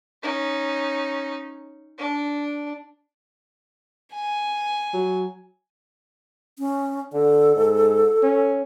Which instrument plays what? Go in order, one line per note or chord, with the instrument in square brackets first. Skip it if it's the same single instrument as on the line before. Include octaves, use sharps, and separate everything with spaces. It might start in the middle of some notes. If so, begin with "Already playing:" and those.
[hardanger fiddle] C#4 D#4
D4
G#5
[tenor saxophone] F#3
[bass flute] C#4
[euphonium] D3 [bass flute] A4
[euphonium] G#2
C#4